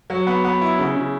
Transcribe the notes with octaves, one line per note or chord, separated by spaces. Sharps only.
F#3
B3
B3
E4
C#3
C#3